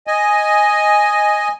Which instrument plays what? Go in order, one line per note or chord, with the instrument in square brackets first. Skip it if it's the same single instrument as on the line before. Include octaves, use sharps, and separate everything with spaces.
[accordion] D#5 G#5